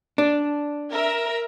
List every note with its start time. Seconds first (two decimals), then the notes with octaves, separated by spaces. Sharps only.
0.18 D4
0.92 A#4 E5